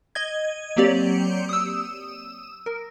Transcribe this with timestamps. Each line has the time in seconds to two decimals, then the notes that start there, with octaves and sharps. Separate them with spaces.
0.15 D#5 G#6
0.76 F#3 A#3 C4 G4 C#5 D5
1.49 D#6 E6
2.66 A#4